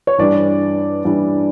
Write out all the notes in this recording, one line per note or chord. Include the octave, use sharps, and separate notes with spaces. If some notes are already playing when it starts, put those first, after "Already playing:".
C#5
G2 E3 G3 D4 D5
G2 E3 G3 D4